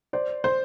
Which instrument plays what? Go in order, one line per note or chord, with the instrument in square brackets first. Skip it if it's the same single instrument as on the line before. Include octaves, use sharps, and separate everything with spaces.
[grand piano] C5 D5
C5